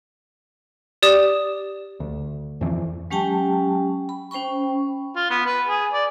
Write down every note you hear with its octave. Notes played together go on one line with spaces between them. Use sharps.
G4 D5 D#6 E7
D2
F2 E3
F#3 G#3 C#4 G4 G5 A5
B5
C#4 C5 G5 B5 C#6
F4
B3
B4
G#4
D5